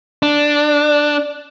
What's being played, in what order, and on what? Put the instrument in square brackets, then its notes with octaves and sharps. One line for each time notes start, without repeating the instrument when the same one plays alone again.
[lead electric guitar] D4